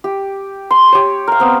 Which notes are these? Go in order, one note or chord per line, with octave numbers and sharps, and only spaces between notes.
G4
C6
G4 C#5
A#4 F5
B3 C4